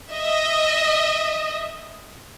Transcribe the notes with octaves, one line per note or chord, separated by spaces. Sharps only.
D#5 E5